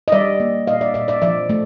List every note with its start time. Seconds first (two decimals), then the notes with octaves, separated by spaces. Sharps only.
0.08 D#5
0.12 G3 D5 E5
0.40 A#3
0.67 A#2 D#5 F5
0.81 D5 E5
0.94 A#2 D5 E5
1.08 D5 E5
1.22 F3 D5 E5
1.49 A3